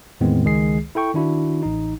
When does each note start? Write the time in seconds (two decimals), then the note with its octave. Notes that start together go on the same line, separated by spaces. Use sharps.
0.21 E2 A2 D#3 G#3 B3 C4
0.44 C#2 D#3 G#3 G#4 C7
0.95 E4 A4 G5 C#6
1.14 D#3 D4 E4 F#4
1.63 A1 D#4